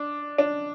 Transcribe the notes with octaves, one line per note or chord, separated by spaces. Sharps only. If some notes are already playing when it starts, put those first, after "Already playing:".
Already playing: D4
D4